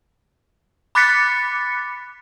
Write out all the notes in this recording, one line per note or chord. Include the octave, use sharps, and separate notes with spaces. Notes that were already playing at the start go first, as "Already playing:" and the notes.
B5 D6 F#6 A6 B6 C#7